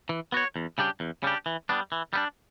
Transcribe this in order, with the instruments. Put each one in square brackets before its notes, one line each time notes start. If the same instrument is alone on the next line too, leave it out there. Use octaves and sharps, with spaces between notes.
[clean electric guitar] E3
B3 F#4 C#5
E2
C#3 G3 D4 G4
E2
C#3 G3 D4 G4
E3
G3 B3 D4
E3
G3 B3 D4